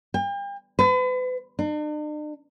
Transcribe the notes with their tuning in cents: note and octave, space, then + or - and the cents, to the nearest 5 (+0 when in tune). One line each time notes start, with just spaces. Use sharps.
G5 +40
B4 +40
D4 +45